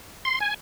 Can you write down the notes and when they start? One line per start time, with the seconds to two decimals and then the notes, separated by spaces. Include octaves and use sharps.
0.25 C6
0.40 G#5